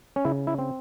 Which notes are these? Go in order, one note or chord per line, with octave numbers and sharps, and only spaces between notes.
C#4
C#3 E4
E4
C4